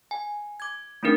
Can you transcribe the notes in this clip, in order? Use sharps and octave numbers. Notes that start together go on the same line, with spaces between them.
G#5
D6 G#6
A3 C4 D4 D#4 A#4